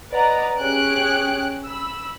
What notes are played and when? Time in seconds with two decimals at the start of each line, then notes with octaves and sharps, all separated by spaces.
0.11 B4 D5 D#5 F#5 A#5
0.60 C#4 G4 G#4 C#5 F#6 D7
1.66 B5 E6